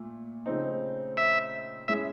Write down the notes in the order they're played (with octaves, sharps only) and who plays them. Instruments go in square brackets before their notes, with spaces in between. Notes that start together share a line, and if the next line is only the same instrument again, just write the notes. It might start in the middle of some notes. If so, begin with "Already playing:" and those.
Already playing: [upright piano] A#2 A3
C#3 F3 A3 C4 D#4
[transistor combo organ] E5
[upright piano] G#3 C#4 E4 G#4 [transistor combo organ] E5